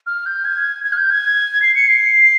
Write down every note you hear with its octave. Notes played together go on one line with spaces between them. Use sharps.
F6
G6
G#6
G#6
F6
G6
G#6
C7
C#7
C7